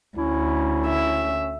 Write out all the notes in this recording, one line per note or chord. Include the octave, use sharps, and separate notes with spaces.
D2 C#4 E4
E5